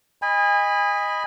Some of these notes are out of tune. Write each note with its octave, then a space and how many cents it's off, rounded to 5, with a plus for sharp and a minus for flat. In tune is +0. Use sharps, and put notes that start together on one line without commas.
D#5 +0 G#5 -30 B5 +0